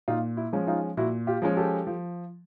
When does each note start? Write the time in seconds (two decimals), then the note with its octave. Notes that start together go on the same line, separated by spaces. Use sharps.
0.08 A#2 D#4 F4
0.37 E4
0.53 F3 G#3 C#4
0.67 D#4 F4
0.97 A#2 E4 F#4
1.27 F4 G4
1.42 F3 G#3 C#4
1.57 G4 A4
1.87 F3